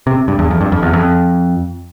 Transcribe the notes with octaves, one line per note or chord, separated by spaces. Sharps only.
C3
G2
E2
F2
G2
F2
E2
F2